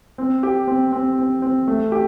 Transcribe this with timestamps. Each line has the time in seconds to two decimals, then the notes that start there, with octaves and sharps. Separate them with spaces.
0.18 C4
0.43 G4
0.67 C4
0.92 C4
1.18 C4
1.42 C4
1.68 A3
1.92 G4